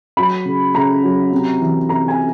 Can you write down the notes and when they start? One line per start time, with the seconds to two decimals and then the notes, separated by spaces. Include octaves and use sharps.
0.17 F#3 B5
0.45 C#3
0.75 C#3 A#5
1.03 F#3
1.32 C3
1.60 E3
1.89 C3 A#5
2.08 G#5